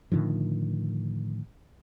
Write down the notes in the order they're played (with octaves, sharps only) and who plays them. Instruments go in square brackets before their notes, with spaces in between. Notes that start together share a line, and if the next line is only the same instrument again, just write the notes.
[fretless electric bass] A2 D3 D#3 F3